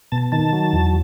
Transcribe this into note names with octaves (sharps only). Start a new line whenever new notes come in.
B2 A5
D#3 A5
F#3
E2